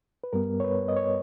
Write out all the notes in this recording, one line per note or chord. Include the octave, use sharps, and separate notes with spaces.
B4
G2 G3 B3 A#4
C#5
B4
D#5
C#5